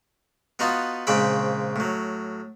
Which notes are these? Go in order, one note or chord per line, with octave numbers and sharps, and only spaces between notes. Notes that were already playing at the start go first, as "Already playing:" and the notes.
B3 D#4 F4 F#4 A5
A#1 G#2 C#3 C4 G5 B5
A2 F#3